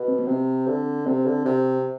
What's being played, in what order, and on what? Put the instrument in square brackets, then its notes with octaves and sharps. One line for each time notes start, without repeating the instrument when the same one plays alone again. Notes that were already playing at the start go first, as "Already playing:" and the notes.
Already playing: [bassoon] B2
[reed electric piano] C4
B3
[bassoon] C3 [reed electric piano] C4
[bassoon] D3
[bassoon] C3 [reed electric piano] C4
[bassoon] D3
C3